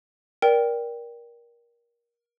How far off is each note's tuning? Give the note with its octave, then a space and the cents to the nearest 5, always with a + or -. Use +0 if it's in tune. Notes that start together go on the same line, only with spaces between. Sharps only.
A#4 +20 D5 +0 G5 +0